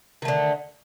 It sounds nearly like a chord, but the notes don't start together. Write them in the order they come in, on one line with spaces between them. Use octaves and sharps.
D#3 A3 D3